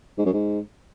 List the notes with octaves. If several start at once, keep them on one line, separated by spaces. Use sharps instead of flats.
G#2
F#2
G#2